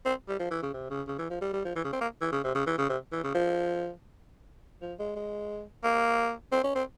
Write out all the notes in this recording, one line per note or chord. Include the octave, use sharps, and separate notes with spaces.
C4
G3
F3
E3
C#3
C3
C#3
C#3
E3
F3
G3
G3
F3
E3
C#3
C4
A#3
E3
C#3
C3
C#3
E3
C#3
C3
E3
C#3
F3
F3
G#3
G#3
A#3
C4
C#4
C4